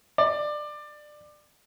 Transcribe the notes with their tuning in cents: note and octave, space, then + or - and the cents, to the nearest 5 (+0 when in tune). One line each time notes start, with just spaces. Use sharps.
D5 +20